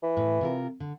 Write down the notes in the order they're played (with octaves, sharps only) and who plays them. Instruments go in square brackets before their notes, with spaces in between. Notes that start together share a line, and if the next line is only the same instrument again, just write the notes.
[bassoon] E3
[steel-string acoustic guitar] A2
C3 F4 A#4
D3